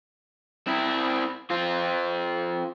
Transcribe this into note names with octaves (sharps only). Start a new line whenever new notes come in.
C4 E4
C4 F4